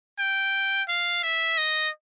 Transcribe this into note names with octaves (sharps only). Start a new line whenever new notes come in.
G5
F5
E5
D#5